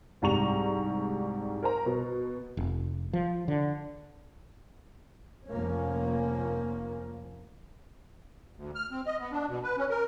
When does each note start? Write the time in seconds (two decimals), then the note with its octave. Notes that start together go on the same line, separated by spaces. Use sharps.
0.22 C2 G#2 G3 A#5 C#6 F7
1.63 A#4 C5 A#5
1.86 B2
2.57 F1
3.13 F3
3.48 D3
5.48 F1 F3 A#3 C#4
8.56 D2
8.75 F6
8.91 C4
9.06 D#5
9.20 B3
9.32 D4
9.49 B2
9.63 B4
9.77 C#4
9.90 A#4